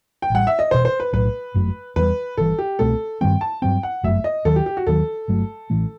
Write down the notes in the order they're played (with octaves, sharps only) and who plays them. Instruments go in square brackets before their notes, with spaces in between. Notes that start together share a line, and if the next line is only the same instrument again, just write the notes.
[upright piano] G5
[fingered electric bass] A1 A2 G3 [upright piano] F#5
[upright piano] E5
D#5
[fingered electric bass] E1 E2 B2 [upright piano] C5
[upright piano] C5
B4
[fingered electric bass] B1 A2 F#3 [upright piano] B4
[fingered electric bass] G1 F#2 F#3 A3
[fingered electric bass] E2 D#3 G3 [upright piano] B4
[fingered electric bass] G1 G2 E3 [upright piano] A4
[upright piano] G4
[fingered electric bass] C2 B2 A3 C4 [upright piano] A4
[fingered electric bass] G2 D#3 G3 C4 [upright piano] G5
[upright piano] A5
[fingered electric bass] G2 F#3 C4 [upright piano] G5
[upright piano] F#5
[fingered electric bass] G1 F#2 F#3 A3 [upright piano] E5
[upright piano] D#5
[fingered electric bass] D#2 D#3 F#3 [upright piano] A4
[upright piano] G4
G4
F#4
[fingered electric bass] D#2 D#3 F#3 [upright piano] A4
[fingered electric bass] G1 G2 F#3 A3
A1 A2 E3 A3